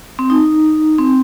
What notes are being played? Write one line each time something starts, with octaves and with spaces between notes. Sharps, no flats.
C4
D#4
C4